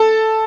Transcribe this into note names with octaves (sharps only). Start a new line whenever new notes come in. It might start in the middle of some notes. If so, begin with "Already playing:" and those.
Already playing: A4 A5